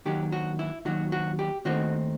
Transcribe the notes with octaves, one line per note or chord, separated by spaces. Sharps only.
D#2 D#3 F#3 G4
F#4
E4
D#2 D#3 F#3 F#4
F#4
G4
D#2 D#3 A3 C4 D#4 F#4